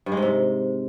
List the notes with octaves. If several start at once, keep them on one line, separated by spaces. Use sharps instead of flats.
G2
G#3
G#2
C3